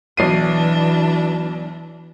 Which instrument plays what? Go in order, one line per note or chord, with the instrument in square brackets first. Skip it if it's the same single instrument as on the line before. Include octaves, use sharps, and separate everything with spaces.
[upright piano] B1 C7 D#7 [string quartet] E3 D4